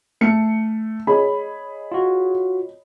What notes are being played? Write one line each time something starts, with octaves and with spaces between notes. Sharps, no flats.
A3 C#7
G#4 C#5 D#5 B5
F4 F#4